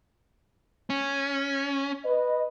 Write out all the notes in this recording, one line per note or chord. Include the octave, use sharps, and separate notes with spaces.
C#4
B4 D#5